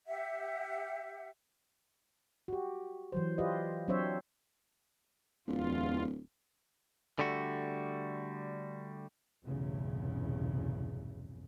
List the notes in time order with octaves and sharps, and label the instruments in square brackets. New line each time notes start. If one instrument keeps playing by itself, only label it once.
[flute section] G4 E5 F#5
[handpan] F#4 G4
E3 F#3 C5
F4 G4 B4 C5 D5 D#5
F#3 C4 D4 C5 C#5 E5
[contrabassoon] D1 [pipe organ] E2 F4
[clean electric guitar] D3 G3 A3 F#4
[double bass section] F1 B1 E2 G2 C#3